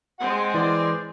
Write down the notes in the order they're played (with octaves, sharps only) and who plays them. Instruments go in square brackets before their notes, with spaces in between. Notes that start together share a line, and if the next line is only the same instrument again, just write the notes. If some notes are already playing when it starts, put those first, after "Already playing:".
[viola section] G#3 C4 [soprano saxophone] F#5
[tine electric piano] E3 [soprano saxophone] D5